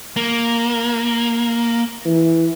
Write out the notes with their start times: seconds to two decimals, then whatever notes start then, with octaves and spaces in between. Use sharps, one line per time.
0.16 A#3
2.05 E3